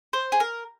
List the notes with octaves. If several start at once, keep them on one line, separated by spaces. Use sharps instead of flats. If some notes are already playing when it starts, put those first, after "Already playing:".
C5
G#4
A#4